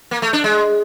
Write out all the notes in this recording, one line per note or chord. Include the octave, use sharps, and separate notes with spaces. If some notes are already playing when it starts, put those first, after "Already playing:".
A#3
A3
D4
G#3